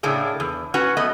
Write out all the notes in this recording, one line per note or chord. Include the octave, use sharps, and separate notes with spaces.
A2 C#3 A3 A#3 D4 G#4
E2
C#4 F#4 B4 F#5
A3 B3 D#5